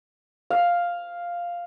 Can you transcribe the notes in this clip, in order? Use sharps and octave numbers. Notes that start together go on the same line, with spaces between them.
F5